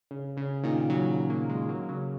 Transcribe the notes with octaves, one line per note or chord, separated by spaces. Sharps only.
C#3
C#3
A#2 D#3
C#3 F#3
F#3 A#3
D#3 G#3
F#3 A#3
C#3 F#3